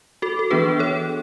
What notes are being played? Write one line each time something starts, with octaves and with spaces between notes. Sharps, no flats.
F#4 A4
A4
E3 B3 D4 G#4 B4
A4 C#5